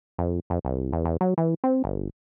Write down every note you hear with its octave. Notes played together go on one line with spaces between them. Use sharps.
F2
F2
C2
E2
E2
F#3
E3
C4
G1